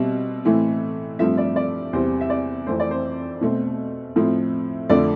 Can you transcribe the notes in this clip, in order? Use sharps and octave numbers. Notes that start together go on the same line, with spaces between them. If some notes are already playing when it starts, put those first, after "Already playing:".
Already playing: B2 G3 C4 E5
A2 E3 A3 C4
G2 F3 A3 C4 E5
D5
D5
E2 C3 G3 C4 C5
E5
D5
F2 E3 A3 C4 C5
D5
C5
B2 A3 C4
A2 F3 A3 C4
F2 D3 F3 A3 D5